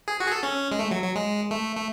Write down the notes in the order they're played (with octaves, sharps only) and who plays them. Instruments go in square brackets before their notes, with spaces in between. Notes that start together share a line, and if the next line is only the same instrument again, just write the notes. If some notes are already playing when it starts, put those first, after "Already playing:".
[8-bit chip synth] G#4
F#4
G#4
A4
C#4
G#3
A3
F#3
F#3
G#3
A3
A3